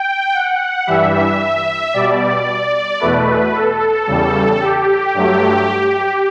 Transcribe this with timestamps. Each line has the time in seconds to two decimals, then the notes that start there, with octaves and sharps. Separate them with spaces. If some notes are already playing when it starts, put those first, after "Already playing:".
Already playing: G5
0.34 F#5
0.87 G2 E3 G3 E5
1.94 B2 G3 D5
3.00 E2 B2 A3 B4
3.54 A4
4.07 E2 C#3 G3
4.60 G4
5.14 G2 F#3 A3